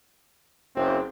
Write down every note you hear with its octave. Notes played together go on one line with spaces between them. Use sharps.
F#1 C4